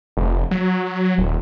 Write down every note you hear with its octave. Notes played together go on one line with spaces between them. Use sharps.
F1
F#3
D#1